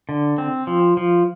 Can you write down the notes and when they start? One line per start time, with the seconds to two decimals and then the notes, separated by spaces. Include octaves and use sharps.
0.09 D3
0.38 C4
0.67 F3
0.97 F3